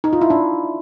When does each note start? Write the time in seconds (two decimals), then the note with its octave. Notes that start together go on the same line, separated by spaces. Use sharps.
0.04 D#4
0.13 F4
0.21 E4
0.30 D4